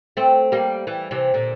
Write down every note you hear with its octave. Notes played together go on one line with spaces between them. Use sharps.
A3 C4
G3 A#3
E3 G3
C3 E3
A#2 D3